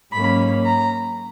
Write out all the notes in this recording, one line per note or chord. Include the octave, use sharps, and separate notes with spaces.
G#2 F#3 A#3 C#4 B5
A#5